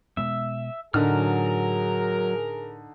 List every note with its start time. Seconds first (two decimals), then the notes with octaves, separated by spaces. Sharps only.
0.17 B2 G#3 B3 E5
0.94 A2 D3 F#3 D#4 G#4 A#4 F6